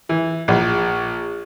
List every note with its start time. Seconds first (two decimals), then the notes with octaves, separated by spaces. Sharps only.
0.09 E3
0.48 A#1